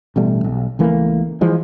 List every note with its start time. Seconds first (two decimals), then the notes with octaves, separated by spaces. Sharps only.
0.16 A1 B2 G3 A3
0.44 B1
0.79 C#2 E3 A3 A#3
1.41 E3 F3 G#3